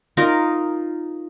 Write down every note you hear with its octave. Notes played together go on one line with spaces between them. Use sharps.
D#4 F4 A#4